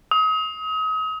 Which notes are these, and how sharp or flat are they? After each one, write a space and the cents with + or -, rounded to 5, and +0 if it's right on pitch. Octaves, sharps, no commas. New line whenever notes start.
D#6 +35